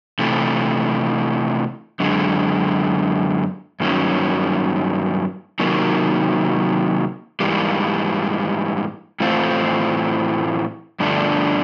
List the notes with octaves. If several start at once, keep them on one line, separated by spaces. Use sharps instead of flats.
C3 E3 A3
F#2 D3 G#3
G2 D#3 F#3 A#3 C#4
C3 D#3 F#3 A#3
G#2 E3 G3 A#3
A2 E3 A3 C4 F4
G2 D3 F3 A3 D4